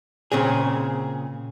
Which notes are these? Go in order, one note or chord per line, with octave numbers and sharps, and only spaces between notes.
A#2 C#3 C4 G#4